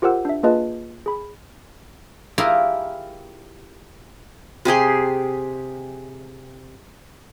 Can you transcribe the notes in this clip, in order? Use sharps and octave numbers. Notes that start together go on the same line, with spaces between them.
F4 G4 A#4 C5 F#5 E6
D4 E5
A#3 F4 G#4 B4 D#5 A5
G#4 B5
E4 F4 G4 G#4 A#4
C3 G4 G#4 C6